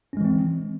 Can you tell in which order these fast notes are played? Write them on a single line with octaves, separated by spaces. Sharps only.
C#4 G#3 E3 C4